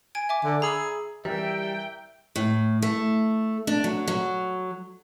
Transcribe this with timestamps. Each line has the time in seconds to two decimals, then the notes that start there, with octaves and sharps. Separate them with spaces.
0.15 G#5 G#6 D7
0.29 E5 G#5 D6
0.44 D3
0.62 G#4 A#5 B5 E6
1.25 E3 G3 A#4 E5 G5
2.36 A2
2.82 A3
3.67 D4
3.84 F#3
4.07 F#3